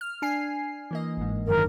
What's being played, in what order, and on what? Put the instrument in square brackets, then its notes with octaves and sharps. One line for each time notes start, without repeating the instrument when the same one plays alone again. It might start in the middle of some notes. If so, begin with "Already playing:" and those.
[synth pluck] F6
D4 G#5 C7
E3 A#3 D#5
G1 G#2
[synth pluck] F#2 D3 D#3 [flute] A#4